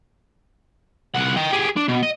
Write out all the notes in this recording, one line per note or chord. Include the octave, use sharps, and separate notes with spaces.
C2 F#5
D#5 G5
G4 G#4
D4
B2
D#5